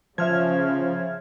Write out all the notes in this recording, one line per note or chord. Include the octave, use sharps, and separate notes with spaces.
C#3 F3 E5 F6 G#6